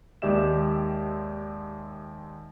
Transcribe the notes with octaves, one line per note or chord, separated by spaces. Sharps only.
D#2 G#3 G4 D5 E5 E7